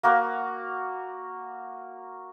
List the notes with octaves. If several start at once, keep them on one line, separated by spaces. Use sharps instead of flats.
A#3 F#4 A#4